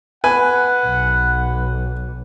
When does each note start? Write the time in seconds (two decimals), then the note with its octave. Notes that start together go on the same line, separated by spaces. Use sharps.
0.24 B4 F#5 G#5
0.85 B1